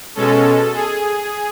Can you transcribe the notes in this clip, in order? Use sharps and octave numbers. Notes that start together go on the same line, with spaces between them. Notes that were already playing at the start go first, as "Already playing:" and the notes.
B2 G#3 C#4 A4
G#4